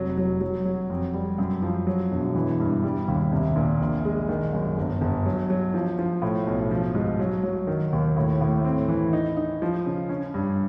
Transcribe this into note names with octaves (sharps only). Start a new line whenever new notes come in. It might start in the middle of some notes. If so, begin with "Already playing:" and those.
Already playing: F1 F#3
F#3
F#3
F#3
F2
G3
F#2
F3
F#3
E1
E3
G2
G3
D#2
C2
A#2
A#1
G#3
D#3
F#2
G1
G1
F#3
F#3
F3
F3
A2
B1
F3
G#2
F#3
F#3
D#3
D#2
A2
A2
C4
E3
D#4
D#4
F3
C#3
C#4
G2